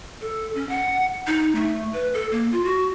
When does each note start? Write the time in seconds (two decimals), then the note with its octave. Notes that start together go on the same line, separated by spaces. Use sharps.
0.21 A4
0.55 C#4
0.69 F#5
1.27 D#4
1.55 A3
1.94 B4
2.14 A4
2.32 A#3
2.52 F4
2.65 F#4